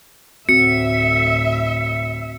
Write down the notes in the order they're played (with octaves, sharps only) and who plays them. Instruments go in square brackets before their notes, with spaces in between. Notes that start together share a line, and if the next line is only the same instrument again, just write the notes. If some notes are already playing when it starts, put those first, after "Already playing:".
[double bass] D2 A2 [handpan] C4 F#4 [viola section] E5 [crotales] C#7